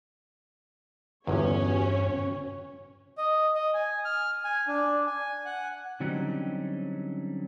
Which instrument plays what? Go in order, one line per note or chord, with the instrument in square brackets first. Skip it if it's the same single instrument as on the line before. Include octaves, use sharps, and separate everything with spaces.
[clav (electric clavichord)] G1 E2 [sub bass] G2 [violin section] C#4 [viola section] F#4 C#5
[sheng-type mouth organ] D#5
D#5
G#5
F6
G#5
D4
G#5
F#5
[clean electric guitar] D3 F#3 G3 C4 C#4 D#4